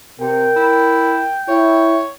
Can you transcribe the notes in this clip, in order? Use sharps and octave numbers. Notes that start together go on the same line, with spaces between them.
C3 A#4 G5
E4
E4 C#5